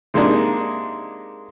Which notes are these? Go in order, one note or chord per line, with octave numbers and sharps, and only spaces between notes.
C3 G#3 A#3 D4 D#4